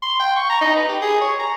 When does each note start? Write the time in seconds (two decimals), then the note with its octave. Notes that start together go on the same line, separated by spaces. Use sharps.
0.03 C6
0.20 G5
0.36 C#6
0.50 A#5
0.61 D#4
0.76 B4
0.89 G4
1.02 G#4
1.21 C#5
1.40 A#5